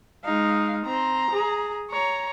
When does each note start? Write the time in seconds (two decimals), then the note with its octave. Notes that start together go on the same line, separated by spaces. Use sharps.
0.25 G#3 D#4 F5
0.85 C4 A#5 C6
1.31 G#4
1.91 C#5 A#5